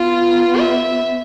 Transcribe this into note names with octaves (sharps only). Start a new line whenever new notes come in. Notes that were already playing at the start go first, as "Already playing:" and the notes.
Already playing: B3 F4
E5